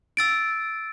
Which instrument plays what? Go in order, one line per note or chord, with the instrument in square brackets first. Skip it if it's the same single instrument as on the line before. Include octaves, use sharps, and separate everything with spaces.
[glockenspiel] E6 A6 D7